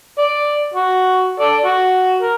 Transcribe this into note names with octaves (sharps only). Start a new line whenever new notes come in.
D5
F#4
A4 D5
F#4
A#4